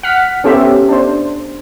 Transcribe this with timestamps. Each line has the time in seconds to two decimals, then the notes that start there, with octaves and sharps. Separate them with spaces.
0.03 F#5 F6 B6
0.44 B3 C#4 G4 A4 C5 E5
0.89 D4 C5